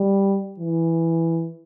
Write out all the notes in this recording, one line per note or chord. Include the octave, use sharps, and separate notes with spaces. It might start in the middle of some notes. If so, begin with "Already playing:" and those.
Already playing: G3
E3